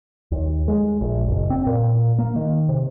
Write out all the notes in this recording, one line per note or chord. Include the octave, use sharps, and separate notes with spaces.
D#2
G#3
A#1
F#1
C4
A#2
A#3
D#3
C3